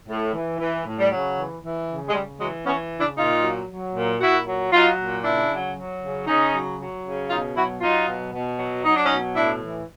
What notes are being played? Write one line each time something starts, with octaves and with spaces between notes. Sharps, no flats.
A2
E3
E3
A2
G3
C#3 F#3
E3
E3
C#3
G#3
C#3 G3
E3 F#3 G#3
E3 B3 C#4
C#3
D4 E4
A#2 D#4 F4
F#3
F#3
A#2
A#2 E4 F#4
F#3
F#3 D#4 F4
A#2
C#3 D4 E4
F#3
F#3
C#3
C#3 C#4 D#4
F#3
F#3
C#3
B2 D#4 F4
F#3 E4 F#4
F#3 D#4 F4
B2
B2
F#3
F#3 D#4
D4
B2 C#4 D#4
A2 D4 E4
E3